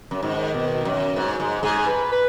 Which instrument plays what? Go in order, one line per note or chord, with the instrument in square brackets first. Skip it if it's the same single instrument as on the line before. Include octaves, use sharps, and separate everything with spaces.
[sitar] F#2
[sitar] G#2 [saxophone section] D#3
[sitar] B2
F#2
[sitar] G#2 [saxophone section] F#3
[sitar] G#2 [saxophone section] G#3
[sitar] G#2 [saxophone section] G#4
[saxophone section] B4
B4